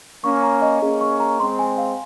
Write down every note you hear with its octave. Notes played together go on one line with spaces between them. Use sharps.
A#3 C#4 C#6
A#5
D#5
A#3 C#4 G#4
C#6
A#5
G#3 C4 C6
G#5
F5